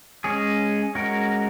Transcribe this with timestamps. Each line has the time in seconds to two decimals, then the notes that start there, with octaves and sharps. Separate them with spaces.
0.24 G#3 C#4 G#4 C#5
0.95 G#3 C#4 F#4 A#4